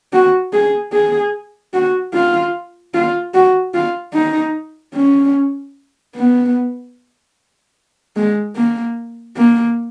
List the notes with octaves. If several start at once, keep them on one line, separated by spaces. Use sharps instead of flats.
F#4
G#4
G#4
F#4
F4
F4
F#4
F4
D#4
C#4
B3
G#3
A#3
A#3